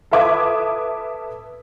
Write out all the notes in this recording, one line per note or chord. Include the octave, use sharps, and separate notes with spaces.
A4 B4 E5 D6 D#6 G#6